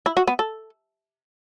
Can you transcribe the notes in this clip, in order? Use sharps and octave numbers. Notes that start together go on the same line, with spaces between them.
E4
F#4
B3
A4